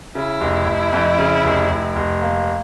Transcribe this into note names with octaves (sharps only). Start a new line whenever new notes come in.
C#3 E4
F1
F1
F2
C#3
F1
F1
F1
A#3